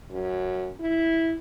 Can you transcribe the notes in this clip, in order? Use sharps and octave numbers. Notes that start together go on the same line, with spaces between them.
F#2
E4